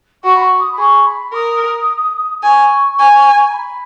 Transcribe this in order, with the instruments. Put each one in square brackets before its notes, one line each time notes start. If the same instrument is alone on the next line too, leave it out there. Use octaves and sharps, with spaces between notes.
[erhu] F#4 [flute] C#6
[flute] B5
C#6
D#6
B5
[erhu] G#4 [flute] C#6
[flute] B5
[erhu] A#4 [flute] D#6
[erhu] G#5 [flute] C#6
[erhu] G#5
[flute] A#5
B5